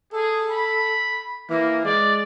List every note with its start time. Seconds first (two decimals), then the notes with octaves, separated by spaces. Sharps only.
0.13 G#4 A4
0.50 B5
1.50 E3 A#3
1.84 G#3 D5